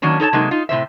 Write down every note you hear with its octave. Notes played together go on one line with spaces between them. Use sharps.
D#3 F#3 A#3 C#4 D4
D#4 A4 C#5 A5
C3 F#3 G#3 A#3 D#4
D#4 F4
A2 C3 C5 E5